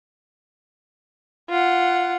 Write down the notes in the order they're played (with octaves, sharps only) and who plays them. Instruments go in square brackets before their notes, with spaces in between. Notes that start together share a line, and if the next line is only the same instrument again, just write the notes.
[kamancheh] F4 F#5